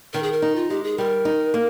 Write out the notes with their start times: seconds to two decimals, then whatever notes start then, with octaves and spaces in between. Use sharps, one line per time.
0.13 D#3 A#4
0.23 G#4
0.32 A#4
0.42 D#4
0.55 F4
0.70 G#3 G4
0.84 G#4
0.98 G3 A#4
1.25 D#4
1.54 A#3